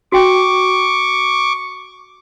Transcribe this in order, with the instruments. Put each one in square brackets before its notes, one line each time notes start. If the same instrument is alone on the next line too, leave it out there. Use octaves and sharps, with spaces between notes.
[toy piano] F#4 G5 [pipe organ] C#6 D6